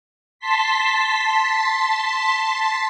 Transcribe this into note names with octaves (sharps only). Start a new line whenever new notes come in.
A5 C6 B6